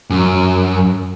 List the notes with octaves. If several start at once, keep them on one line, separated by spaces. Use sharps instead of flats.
F#2